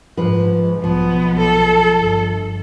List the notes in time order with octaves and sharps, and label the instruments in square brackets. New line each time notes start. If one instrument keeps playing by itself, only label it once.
[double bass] G#2 [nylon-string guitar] F3 B4
[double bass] B1 [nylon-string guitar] F3 [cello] B3
[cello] A4
[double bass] G1